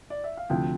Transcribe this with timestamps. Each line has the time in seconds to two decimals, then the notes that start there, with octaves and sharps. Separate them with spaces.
0.10 D5
0.24 E5
0.37 F5
0.50 D2 C3 F3 G5